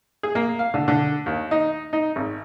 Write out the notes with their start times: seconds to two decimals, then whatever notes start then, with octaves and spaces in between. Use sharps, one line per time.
0.23 G#4
0.35 A#3
0.59 F5
0.74 D3
0.88 D3
1.26 D#2
1.51 D#4
1.93 D#4
2.16 G#1